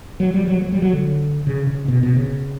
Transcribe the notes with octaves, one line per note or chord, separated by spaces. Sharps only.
F#3
G3
F#3
F#3
G3
F#3
D3
C#3
C#3
B2
B2
C#3